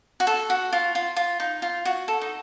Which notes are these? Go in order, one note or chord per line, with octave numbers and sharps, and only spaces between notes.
F#4
A4
F#4
F4
F4
F4
D#4
F4
F#4
A4
D#4